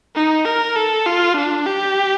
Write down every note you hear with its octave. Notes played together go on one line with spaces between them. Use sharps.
D#4
A#4
A4
F4
D4
G4